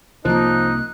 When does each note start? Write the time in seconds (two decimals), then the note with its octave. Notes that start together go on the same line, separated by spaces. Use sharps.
0.25 C2 F3 A#3 D#4 F#6